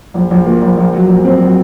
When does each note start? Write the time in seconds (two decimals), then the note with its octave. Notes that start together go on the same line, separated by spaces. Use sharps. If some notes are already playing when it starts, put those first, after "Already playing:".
0.14 A#1
0.31 A#1
0.46 A#2
0.62 A#1
0.77 A#1
0.93 F#3
1.09 A#1
1.25 C4
1.41 F#3